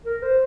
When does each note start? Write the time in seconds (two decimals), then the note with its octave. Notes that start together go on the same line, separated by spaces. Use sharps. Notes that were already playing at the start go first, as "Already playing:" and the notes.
0.06 A#4
0.23 C5